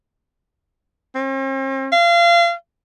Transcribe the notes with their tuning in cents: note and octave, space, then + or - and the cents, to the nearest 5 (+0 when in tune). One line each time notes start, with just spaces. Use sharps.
C4 +45
F5 -30